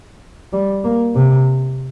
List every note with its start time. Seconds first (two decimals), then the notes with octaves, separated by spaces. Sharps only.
0.53 G3
0.84 A#3
1.15 C3